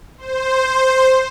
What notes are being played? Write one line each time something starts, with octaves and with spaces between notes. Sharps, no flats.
C5